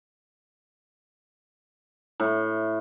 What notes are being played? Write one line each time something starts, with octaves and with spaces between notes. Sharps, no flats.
A2